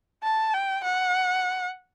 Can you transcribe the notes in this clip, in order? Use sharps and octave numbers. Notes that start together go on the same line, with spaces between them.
A5
G5
F#5